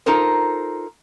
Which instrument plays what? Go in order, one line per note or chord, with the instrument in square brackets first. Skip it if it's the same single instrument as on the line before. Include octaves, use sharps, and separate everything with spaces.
[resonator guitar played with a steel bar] D#4 F4 A4 A#4 C5